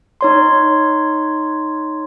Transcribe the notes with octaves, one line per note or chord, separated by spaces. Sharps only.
D#4 C#5 C6